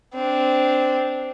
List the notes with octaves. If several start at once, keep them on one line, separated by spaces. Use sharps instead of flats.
C4 D4